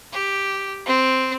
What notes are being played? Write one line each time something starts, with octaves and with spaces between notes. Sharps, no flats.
G4
C4